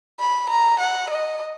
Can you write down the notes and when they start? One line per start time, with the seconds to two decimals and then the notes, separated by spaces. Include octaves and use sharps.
0.19 B5
0.50 A#5
0.80 F#5
1.10 D#5